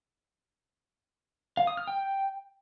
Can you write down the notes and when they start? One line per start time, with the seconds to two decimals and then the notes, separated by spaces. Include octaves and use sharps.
1.57 F5
1.67 D#6
1.77 F6
1.87 G5